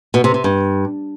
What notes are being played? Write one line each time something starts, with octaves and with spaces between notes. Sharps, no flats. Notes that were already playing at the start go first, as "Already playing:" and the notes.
B2
C3
C3
G2